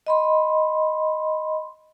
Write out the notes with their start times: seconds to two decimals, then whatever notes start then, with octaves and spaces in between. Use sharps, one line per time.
0.07 D#5 B5 C6